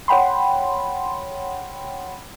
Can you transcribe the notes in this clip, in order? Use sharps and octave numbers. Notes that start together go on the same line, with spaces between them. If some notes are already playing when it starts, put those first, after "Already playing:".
C#5 F#5 G5 B5 C6